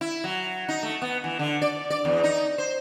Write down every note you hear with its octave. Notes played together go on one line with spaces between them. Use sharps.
E4
F#3
D#4
A3
B3
E3
D3
D5
D5
E2
D#4
C5